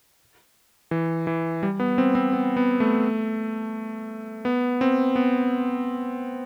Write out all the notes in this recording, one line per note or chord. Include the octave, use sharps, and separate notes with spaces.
E3
E3
G3
B3
C4
C4
B3
B3
A3
B3
C4
B3